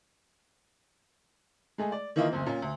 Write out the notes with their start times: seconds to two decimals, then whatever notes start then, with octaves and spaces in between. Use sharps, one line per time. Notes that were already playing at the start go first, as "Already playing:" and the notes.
1.78 G#3 A3 G#4
1.92 D5
2.16 D#3 E3 A#3 E4 F4 D#5
2.32 F#1 D2 C4
2.46 A#2 C#4
2.62 D2